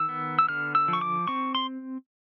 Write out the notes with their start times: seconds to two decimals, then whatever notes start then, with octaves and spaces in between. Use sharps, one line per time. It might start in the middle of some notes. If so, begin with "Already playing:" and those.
Already playing: D#3 E6
0.09 B3
0.39 E6
0.48 D3 F6
0.75 E6
0.88 F3
0.93 C#6
1.01 D6
1.28 C4 C#6
1.55 C6